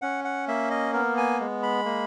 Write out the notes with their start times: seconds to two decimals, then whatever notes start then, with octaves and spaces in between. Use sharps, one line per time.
0.02 C#4 F#5
0.24 F#5
0.48 A#3 E5
0.71 D#5
0.93 B3 A#4
1.17 G#5
1.40 G#3
1.63 B5
1.85 A#3